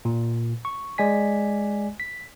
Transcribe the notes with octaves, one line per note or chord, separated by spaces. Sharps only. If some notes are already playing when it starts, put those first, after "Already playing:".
A#2
C#6
G#3 D5 G#5 B6
B6